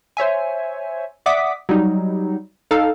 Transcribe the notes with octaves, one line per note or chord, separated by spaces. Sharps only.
C5 C#5 E5 G#5
D5 E5 F#5 D6 D#6 B6
F#3 G3 D#4
D#4 A4 F5